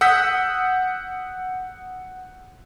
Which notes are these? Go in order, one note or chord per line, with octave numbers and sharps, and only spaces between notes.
F#5 D#6 E6 G6 B6